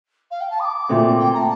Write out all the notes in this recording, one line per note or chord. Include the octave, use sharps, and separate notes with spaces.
F5
G5
A5
D#6
D6
A#2 A3 C4
G5
A#5
A5